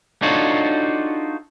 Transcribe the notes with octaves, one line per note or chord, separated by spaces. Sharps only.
D4 D#4 F4 F#4 A4 C#5